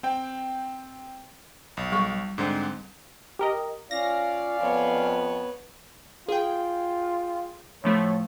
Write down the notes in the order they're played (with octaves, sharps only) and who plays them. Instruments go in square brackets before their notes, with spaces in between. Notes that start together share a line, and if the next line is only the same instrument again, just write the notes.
[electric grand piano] C4 G5
B1
[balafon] G3 C#6
[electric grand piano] G#2 D3 C4
[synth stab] G4 A#4 D#5
[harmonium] C#4 D5 F5 [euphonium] F4 [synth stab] A#6
[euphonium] F2 [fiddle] B3 C#5
[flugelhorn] F4 [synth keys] G#4 G5
[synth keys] A2 F3 A3 [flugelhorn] C#5